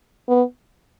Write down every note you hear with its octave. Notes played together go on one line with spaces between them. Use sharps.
B3